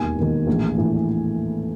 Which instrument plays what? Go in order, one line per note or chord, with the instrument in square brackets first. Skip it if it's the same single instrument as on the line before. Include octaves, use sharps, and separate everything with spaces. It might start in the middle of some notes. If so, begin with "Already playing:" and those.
Already playing: [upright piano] E1 D#2 D#3 G#5
E1 D#2 D#3
A#1 A2 E3
A#1 A2 E3